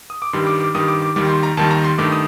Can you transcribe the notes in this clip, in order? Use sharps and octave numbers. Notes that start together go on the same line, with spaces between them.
D#6
D6
G2 D#3 G3 C6
D6
D6
G2 D#3 G3 D#6
D6
D6
D#2 D#3 G3 D6
C6
A#5
D#2 D#3 G3 A5
A#5
C6
G2 D#3 A3 D6
D#6